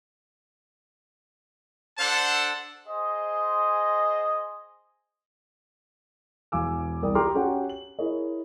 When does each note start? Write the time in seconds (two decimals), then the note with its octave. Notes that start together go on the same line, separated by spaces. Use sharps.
1.98 D4 A4 C5 F#5 A5
2.87 G#4 C5 D#5
6.52 E1 E2 F5 G#5 D6 E6
7.03 C2 A#4 D5 G5 D#6
7.15 G4 G5 A#5 C6 D6 F6
7.35 C#4 F#4 G4 C#5 F#5 G5
7.69 F#7
7.99 E4 G#4 A#4 C#5 D#5